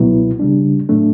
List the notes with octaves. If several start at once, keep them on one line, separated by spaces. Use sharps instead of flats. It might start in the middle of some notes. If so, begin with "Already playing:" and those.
Already playing: C#2 B2 F#3 B3 E4
C#3 G3 D4
A2 F#3 A3 D4